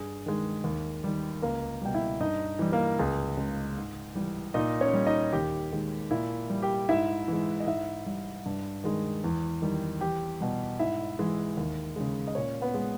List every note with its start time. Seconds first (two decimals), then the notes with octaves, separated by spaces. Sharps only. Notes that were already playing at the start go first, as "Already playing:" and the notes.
Already playing: G2 G#4
0.26 D#3 G#3
0.64 D#2
1.04 D#3 G3
1.42 C#2 A#3 A#4
1.82 B2 G3 G5
1.94 E4 E5
2.20 G2 D#4 D#5
2.59 E3 G3
2.72 A#3 A#4
2.99 C#2 G#4
3.37 C#3 G#3
3.77 G#2
4.15 E3 G3
4.54 A#2 D#4 D#5
4.81 C#4 C#5
4.93 G3
5.07 D#4 D#5
5.33 D#2 G4 G5
5.72 D#3 G#3
6.11 A#2 E4 E5
6.50 G3
6.62 G4 G5
6.89 G#2 E4 E5
7.28 E3 G#3
7.60 D#5
7.67 G#2 E4 E5
8.06 G3
8.46 G2
8.84 D#3 G#3
9.24 E2
9.62 D#3 G3
10.01 E2 G4 G5
10.41 B2 G3
10.79 G#2 E4 E5
11.19 E3 G#3
11.57 D#2
11.96 C#3 G#3
12.27 D#5
12.35 A#2 C#4 C#5
12.62 B3 B4
12.74 G#3